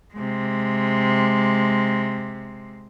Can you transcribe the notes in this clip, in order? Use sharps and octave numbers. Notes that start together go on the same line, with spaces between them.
C3 G#3